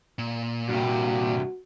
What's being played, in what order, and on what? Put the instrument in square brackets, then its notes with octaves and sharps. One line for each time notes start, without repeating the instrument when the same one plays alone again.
[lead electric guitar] A#2
[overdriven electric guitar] G2 C3 [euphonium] F#4